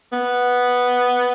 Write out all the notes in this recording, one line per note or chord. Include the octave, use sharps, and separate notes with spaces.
B3